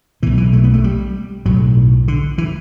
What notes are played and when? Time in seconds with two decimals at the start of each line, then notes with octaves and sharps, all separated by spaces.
0.23 B2 E3
0.26 B1
0.38 E3
0.53 A3
0.64 B3
0.74 A3
0.84 G3
1.46 B1 A2 F#3
2.08 D3
2.38 E3